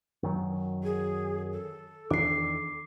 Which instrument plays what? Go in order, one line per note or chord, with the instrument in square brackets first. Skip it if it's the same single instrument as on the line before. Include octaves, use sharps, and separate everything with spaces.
[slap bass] F#2 D#3 F#3
[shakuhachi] G#4
A4
[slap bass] E2 D#3 D4 [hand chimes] D6 C7